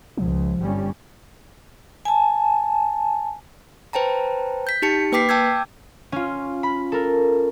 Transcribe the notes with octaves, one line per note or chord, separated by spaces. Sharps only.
C#2 F3
G1 G3 C#4
G#5 A5
B4 C5 G5 A5 A#5
G6 B6
D#4 G4 A5 C#7
A#3 B4 G5 D6 B6 C7
G5 A5 D6 E6 G6 G#6
C#4 F4
B5
A4 A#4